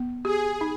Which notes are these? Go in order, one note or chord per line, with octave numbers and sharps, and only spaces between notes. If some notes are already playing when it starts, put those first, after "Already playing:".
Already playing: B3
G4 G#4
D#4